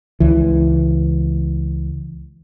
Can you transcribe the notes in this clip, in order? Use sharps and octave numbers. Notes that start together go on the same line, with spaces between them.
C#2 E3